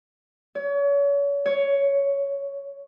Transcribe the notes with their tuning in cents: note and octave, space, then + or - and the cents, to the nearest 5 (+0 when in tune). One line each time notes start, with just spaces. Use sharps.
C#5 +35
C#5 +10